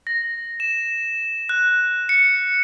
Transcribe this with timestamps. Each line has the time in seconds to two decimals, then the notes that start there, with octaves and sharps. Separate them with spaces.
0.07 A#6
0.60 E7
1.49 F#6
2.09 C#7